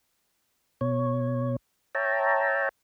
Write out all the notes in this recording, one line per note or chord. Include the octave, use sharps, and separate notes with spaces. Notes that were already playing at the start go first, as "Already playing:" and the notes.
B2 C#5
C#5 E5 G5 A5 A#5